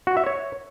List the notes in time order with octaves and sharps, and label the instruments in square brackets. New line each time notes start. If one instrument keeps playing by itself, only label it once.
[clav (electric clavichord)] F#4
E5
C#5